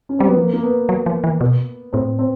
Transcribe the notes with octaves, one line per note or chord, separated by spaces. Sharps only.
C#4
G3 C4
F#3 B3
F3 A#3
A#3
B3
F#3
F3
E3
B2
A2 C4
C4